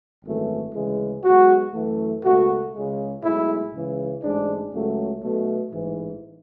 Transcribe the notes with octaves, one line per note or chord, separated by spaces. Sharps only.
G#1 F#2 E3 A3
D2 C#3 E3 G#3
B1 B2 G#3 F#4
F#2 E3 A3
C#2 B2 A3 F#4
C#2 C#3 G#3
B1 A2 G#3 E4
C#2 C#3 E3
A1 G#2 G#3 D4
C#2 C#3 F#3 A3
B1 B2 A3
A1 G#2 E3